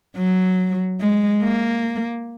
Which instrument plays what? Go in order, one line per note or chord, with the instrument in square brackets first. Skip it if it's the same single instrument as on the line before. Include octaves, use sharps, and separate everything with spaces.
[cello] F#3
G#3
A#3